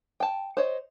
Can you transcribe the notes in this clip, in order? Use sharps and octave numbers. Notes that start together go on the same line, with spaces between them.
G5 A5
C5 C#5 D#5